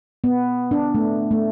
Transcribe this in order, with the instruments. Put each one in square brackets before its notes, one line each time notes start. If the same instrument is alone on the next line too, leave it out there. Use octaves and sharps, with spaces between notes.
[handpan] B3
D4
A3
A3